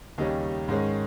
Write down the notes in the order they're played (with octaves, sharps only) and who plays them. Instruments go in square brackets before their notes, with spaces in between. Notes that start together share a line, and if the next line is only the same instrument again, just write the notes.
[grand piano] D#2 C#3 G3 C#4 D#4
G#2 D#3 G#3 C#4